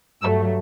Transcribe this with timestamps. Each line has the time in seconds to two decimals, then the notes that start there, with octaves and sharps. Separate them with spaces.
0.23 G2 F#3 A3 E6